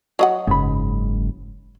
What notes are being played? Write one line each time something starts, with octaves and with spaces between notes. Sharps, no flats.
F#3 D#5 F#5
F#1 G#2 B5